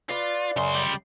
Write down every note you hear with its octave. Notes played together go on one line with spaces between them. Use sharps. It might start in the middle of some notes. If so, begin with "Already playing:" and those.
F4 B4 D5
C#2 F#2 C#3 C6
G3